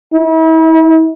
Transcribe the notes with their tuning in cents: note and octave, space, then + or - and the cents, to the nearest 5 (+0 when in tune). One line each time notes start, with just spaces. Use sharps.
E4 -40